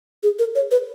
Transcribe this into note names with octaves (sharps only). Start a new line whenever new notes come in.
G#4
A#4
C#5
B4